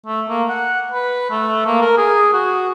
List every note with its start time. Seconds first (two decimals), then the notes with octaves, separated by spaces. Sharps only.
0.06 A3
0.29 A#3
0.49 F#5
0.92 B4
1.31 A3
1.66 A#3
1.82 A#4
1.97 G#4
2.34 F#4